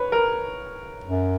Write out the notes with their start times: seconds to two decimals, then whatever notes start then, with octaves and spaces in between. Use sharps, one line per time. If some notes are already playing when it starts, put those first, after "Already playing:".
Already playing: B4 C#5
0.12 A#4
1.04 F#2